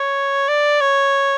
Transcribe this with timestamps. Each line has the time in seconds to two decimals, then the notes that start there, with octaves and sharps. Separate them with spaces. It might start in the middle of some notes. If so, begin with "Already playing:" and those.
Already playing: C#5
0.48 D5
0.81 C#5